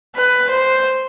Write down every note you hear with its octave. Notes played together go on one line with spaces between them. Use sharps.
B4
C5